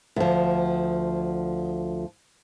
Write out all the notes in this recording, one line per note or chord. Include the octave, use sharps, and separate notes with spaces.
D2 F3